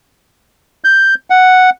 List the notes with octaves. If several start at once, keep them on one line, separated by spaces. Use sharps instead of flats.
G6
F#5